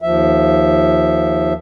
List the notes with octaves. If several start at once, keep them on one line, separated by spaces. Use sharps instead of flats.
D#2 F3 E5